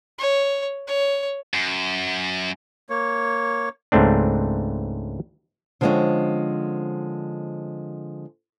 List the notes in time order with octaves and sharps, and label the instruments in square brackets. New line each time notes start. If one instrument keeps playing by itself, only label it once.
[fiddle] C#5
C#5
[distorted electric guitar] F#2
[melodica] A#3 C#5
[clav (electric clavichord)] C#2 G#2 A3 C4 D4
[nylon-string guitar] D3 F3 G3 G#3 C4 C#4